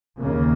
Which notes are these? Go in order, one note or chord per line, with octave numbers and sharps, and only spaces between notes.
D#2 C#3 A#3